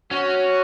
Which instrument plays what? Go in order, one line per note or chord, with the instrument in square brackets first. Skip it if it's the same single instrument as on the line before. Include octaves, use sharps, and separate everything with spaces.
[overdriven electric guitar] C#4 [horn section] F#4